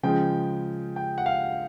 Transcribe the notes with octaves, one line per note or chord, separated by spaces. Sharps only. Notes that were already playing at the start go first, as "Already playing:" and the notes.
C#3 F3 G#3 G5
G5
F#5
F5